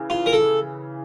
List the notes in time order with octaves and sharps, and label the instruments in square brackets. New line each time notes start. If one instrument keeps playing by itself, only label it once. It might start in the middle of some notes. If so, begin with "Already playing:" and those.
Already playing: [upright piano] C#3 E3
[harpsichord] F4
A#4
A4